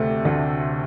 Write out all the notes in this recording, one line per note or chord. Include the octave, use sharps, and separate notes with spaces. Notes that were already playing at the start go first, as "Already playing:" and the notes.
Already playing: D2 C3 A3
D2